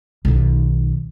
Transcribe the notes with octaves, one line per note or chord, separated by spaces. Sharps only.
B1 D#3